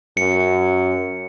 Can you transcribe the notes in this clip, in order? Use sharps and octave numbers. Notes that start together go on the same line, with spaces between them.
F#2 C#7